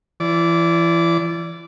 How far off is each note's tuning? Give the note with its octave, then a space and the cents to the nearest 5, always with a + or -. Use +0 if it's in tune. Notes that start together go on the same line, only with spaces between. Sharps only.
E3 +30 D5 -20